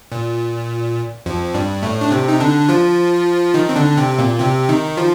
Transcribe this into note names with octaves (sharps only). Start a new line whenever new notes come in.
A#2
F2 F3
G2 G3
A2 A3
D4
C3 C4
D#4
D3 D4
F3 F4
D#3 D#4
C4
D3 D4
C3 C4
A#2 A#3
C3 C4
D#3 D#4
F3 F4